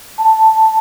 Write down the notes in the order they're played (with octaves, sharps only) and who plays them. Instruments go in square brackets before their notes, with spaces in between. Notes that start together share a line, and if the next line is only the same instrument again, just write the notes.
[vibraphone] A5